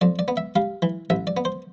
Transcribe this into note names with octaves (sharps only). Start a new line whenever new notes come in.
F2 D5
D5
B3
E5
G3 F5
E3
A1 E5
D5
B3
C5